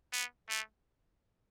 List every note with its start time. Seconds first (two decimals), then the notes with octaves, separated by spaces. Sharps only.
0.13 B3
0.49 A3